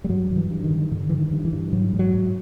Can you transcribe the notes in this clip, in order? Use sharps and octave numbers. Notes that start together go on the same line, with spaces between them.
G3
G2 F#3
G2 D#3
E3
G2
D#3
D3
G2 D3
G2 E3
D#3
G2
E3
G2
G#2 F#3
G#2
F#3
G#2